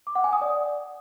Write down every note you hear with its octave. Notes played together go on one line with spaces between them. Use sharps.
D6
F#5
G#5
D#6
D5